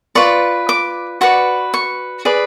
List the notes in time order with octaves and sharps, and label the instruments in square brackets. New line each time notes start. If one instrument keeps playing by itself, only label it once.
[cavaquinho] F4 B4 D5 C#6
D6
F#4 B4 D5 C#6
C#6
G#4 B4 D5